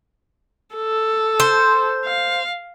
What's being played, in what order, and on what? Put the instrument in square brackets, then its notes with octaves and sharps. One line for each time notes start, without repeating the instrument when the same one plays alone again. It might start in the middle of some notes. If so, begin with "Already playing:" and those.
[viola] A4
[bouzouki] C5
[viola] F5